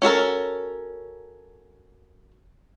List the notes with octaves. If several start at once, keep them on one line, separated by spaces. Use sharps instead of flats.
C#4 F#4 A4 A#4